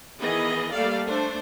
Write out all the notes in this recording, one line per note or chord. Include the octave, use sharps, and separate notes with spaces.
D#3 E3 B3 G#4 D#5
G3 A3 A#3 A4 D5 F5
A3 D4 A4 C5